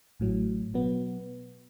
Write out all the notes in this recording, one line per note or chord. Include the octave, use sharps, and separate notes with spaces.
A1 A2 F#3
B2 F#3 B3